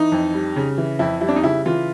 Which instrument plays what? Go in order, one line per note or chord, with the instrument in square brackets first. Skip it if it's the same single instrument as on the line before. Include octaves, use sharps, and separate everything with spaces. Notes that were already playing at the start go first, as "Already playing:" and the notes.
Already playing: [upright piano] E3 D#4
F2
G3
C#3
E3
F2 E4
G3 E4
D4
D#4
C#3 E4
E3 F4